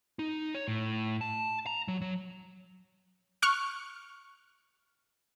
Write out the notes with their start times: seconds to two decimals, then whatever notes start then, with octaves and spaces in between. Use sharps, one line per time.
0.19 D#4
0.54 C#5
0.68 A2
1.21 A5
1.66 A#5
1.88 F#3
2.01 F#3
3.42 C#6 F6 F#6 C#7